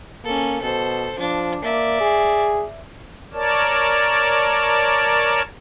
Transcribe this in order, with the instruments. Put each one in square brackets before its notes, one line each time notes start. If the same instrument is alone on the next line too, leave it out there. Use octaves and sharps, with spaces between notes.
[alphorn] A#3 [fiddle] C#4 A4
[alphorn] B2 [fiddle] A4 C5
[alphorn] F3 [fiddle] D4
[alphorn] A#3 [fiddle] D5 E5
[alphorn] G#4
[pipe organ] A#4 C#5 D5 A5